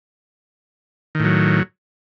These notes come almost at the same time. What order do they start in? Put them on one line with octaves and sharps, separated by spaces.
D#3 A2 F#3